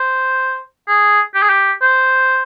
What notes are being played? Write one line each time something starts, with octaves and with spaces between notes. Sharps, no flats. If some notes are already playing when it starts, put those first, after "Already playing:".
Already playing: C5
G#4
G4
G#4
G4
C5